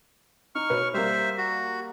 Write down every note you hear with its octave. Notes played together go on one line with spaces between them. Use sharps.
D#4 C#6 F6
B2 B4 C#5
G3 A#3 C5 E5
F#4